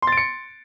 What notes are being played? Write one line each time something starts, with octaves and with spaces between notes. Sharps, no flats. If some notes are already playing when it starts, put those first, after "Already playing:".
C6 A6 C#7 D7